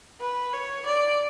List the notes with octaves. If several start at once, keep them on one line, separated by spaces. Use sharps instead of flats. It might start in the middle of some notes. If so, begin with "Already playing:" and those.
B4
C#5
D5